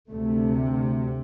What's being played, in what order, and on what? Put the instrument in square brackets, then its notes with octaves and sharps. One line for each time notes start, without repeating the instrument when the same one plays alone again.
[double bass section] D2 C3 A3